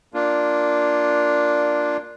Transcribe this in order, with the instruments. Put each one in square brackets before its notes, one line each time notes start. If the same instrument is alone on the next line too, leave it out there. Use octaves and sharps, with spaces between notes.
[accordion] A#3 D4 F4